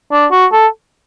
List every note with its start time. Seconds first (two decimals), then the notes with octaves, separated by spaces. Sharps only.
0.12 D4
0.32 F#4
0.52 A4